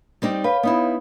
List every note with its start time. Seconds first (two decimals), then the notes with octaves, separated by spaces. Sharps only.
0.22 G3 C4 D#4
0.44 B4 C#5 F5
0.63 B3 D#4 E4